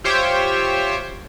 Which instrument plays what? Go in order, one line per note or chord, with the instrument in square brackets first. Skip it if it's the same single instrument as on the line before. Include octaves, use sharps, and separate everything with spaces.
[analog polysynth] F4 G4 C5 C#5 E5 G5